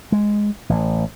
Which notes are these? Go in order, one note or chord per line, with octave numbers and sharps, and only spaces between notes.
G#3
A1